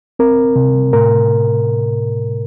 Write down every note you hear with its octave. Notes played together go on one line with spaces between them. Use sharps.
C4 A#4
C3
A2 A#4